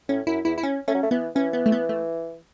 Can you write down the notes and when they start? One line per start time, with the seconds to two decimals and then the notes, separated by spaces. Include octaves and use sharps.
0.09 A2 C#4
0.27 F#2 E4
0.45 E2 E4
0.58 E4
0.63 C#4
0.87 A3 C#4
0.94 F#3
1.03 A3
1.11 E3 B3
1.35 E3 C#4
1.53 B3
1.66 A3
1.72 B3
1.89 A3